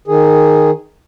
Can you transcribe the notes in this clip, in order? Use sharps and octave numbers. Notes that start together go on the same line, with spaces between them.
D#3 G#4